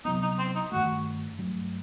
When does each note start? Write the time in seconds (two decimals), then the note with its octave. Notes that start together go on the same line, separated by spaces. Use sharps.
0.05 C3 F#3 B3 D#4
0.22 D#4
0.39 C4
0.55 D#4
0.72 G2 D#3 A3 F#4
1.39 G2 F#3 A3